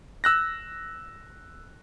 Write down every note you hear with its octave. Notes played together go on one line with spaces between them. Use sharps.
E6 F#6 A#6